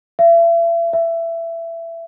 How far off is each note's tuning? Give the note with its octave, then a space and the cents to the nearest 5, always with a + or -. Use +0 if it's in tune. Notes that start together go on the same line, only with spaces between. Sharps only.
E5 +40
E5 +20